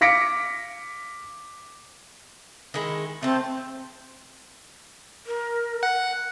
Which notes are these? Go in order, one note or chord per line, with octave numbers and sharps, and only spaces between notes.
F5 D6 A#6 B6 C#7 D7
D#3 G#3 E4
A3 C4 A5
A#4
F#5